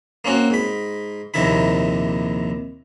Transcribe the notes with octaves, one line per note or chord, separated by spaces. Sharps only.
A#3 C4 C#4 F#4
G#2 B5
A#1 D#2 C3 D#3 E4 B5